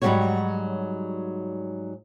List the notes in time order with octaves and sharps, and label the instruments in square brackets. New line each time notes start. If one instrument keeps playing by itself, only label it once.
[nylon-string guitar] G#2 F#3 G3 A#3 F#4 C#5